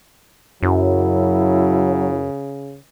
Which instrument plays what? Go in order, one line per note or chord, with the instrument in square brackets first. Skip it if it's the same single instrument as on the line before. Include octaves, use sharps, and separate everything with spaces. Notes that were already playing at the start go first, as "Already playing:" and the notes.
[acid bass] F#2 [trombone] C#3 [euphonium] F#3 [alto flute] E4